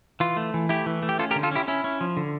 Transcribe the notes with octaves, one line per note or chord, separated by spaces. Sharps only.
E3 F4
A3
E3
A3 E4 G4
E3
A3
G4
C#4 F4 A4
G4 A#4
D3
F4 A4
C#4 E4 G4
C#4 E4
C#4
F3
D3